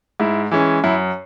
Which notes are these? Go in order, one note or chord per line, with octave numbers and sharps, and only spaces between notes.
G#2 E4
E3 G#3 C#4
F#2 E4